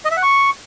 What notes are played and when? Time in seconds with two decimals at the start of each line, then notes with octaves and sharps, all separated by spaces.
0.05 D#5
0.11 E5
0.17 F#5
0.23 C#6